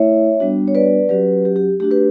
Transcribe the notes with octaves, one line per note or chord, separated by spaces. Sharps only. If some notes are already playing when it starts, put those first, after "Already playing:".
Already playing: A3 E4 C#5 E5
G3 B3 D4 F#4
C#5
B4 D5
F#3 C#4 F#4 G4 B4
G4
G4
A3 D4 F#4 G4
G4 B4